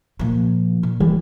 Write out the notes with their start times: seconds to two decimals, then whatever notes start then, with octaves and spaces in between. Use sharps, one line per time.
0.19 A#2 F3
0.83 A#2
1.00 D#3 E3 G3 G#3